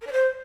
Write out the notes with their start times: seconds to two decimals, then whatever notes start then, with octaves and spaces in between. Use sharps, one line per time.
0.01 A#4
0.06 D5
0.12 C5